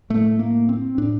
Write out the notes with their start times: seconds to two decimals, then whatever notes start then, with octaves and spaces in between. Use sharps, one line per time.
0.10 A2 A3
0.39 A#3
0.69 C4
0.98 A2 D4